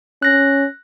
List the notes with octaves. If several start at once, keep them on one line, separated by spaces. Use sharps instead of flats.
C#4 F#6 A#6